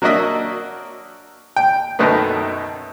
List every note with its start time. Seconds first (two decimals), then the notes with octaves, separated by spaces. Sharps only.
0.02 F#3 A#3 D4 F#4 D#5 E5
1.56 G5
1.99 F#2 B2 D#3 A3 B3 D#4